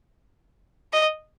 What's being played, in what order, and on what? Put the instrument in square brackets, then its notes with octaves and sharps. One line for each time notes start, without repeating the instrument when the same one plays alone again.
[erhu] D#5